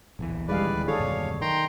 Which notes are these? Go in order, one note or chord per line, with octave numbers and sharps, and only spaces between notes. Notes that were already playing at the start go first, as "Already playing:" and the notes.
D1 A#1 E2 E3
D#1 D3 G3 G#3 G#4 B4 D5 F5
D4 G#4 A4 C#5 F5
F#2 B2
D#3 G5 A#5 C6